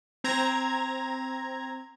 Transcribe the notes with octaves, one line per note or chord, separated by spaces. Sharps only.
C4 A#5 G#6